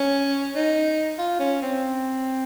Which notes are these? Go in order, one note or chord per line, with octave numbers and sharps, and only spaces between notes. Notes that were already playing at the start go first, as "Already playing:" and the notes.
Already playing: C#4
D#4
F4
C#4
C4